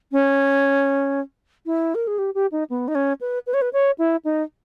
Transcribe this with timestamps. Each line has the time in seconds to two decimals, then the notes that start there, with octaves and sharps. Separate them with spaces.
0.12 C#4
1.66 E4
1.95 A#4
2.07 G#4
2.18 G4
2.35 G4
2.52 D#4
2.70 B3
2.88 D#4
2.95 C#4
3.21 B4
3.47 B4
3.54 C#5
3.62 B4
3.73 C#5
3.98 E4
4.25 D#4